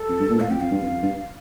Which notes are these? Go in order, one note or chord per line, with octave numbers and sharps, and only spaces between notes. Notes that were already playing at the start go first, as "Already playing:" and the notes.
Already playing: A4
F2
G2
A#2
A2 F5
F2 G5
F2 F5
G2
F2
F2
G2